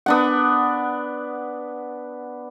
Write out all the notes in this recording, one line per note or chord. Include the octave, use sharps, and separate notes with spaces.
B3 D4 F#5